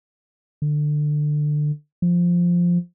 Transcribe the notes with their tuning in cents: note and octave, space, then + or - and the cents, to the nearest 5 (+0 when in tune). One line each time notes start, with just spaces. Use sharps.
D3 +20
F3 +0